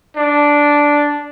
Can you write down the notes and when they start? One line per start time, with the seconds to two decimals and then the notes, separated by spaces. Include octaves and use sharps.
0.16 D4